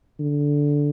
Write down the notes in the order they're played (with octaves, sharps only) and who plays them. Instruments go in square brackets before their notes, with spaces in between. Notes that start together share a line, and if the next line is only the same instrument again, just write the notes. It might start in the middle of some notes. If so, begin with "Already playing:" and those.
[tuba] D3